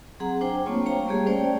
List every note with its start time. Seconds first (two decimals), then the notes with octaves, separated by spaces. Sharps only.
0.20 F#3 C4 G#4 F#5 A#5
0.41 D4 C5 G5 G#5
0.66 A3 A#3 C4 F4 C#5 C#6
0.86 C5 C#5 F5 G5 A#5
1.07 G3 A3 A#3 G4 G#4 C#5
1.26 A3 C#4 C5 D5 G5